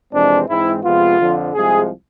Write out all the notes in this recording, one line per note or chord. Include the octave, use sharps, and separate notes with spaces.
F2 C3 E3 G#3 C4 D4
G#2 E3 G#3 C4 E4
F2 C3 G#3 B3 F4
F2 D3 F3
C2 C3 F3 G#3 G#4